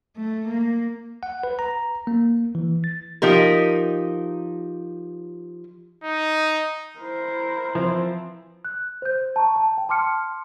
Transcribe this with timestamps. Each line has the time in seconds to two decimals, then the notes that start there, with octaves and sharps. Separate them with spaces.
0.17 A3
0.49 A#3
1.23 F#5
1.43 B4
1.59 A#5
2.07 A#3
2.55 E3
2.84 A6
3.22 F3 D#4 G4 A#4
6.04 D#4
6.99 E4 A#4 C5
7.75 E3 F3 C4
8.65 F#6
9.02 C5 G6
9.36 A5 A#5 C#6
9.56 A5
9.78 G5
9.89 A5 C6 D6 F6 C#7